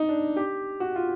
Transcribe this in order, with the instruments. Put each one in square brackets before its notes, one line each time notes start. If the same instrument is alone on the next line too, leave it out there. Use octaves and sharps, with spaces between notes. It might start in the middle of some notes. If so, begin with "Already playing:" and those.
Already playing: [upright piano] D#4
D4
G4
F#4
F4